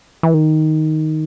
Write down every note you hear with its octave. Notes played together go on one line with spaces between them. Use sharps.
E3
D#3